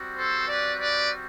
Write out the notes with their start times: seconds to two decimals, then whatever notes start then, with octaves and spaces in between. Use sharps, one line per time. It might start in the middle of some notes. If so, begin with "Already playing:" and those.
Already playing: G3 C4 F#4
0.16 A4 C5
0.48 B4 D5
0.78 B4 D5